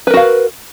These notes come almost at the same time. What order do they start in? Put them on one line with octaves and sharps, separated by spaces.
B4 A#4 F#4 F5